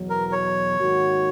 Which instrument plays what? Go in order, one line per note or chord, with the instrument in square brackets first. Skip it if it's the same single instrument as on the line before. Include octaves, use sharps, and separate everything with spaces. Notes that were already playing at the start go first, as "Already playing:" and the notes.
Already playing: [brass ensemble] E2 B2 F#3
[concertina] A#4
C#5
[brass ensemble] G#2 D#3 A#3 D#4 F#4